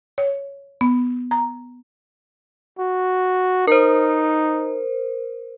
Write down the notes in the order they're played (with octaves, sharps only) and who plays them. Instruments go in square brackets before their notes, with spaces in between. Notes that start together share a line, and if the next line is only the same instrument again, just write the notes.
[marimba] C#5
B3
A#5
[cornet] F#4
[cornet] D#4 [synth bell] A#4 C5